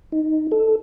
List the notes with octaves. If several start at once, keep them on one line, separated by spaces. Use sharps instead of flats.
D#4
A4